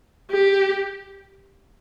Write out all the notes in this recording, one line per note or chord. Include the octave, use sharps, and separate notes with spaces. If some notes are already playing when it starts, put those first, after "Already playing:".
G4